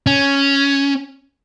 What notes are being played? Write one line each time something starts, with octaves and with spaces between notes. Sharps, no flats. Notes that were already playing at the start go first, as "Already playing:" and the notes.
C#4